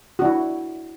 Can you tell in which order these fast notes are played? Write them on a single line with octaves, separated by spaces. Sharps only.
F#4 D4 E4